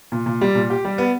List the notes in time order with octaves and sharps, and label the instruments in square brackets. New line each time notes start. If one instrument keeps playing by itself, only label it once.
[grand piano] A#2
A#2
G3
A#2
G4
G3
B3